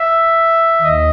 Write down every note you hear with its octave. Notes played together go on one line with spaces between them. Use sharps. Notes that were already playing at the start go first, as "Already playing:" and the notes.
Already playing: E5
D#2 D#5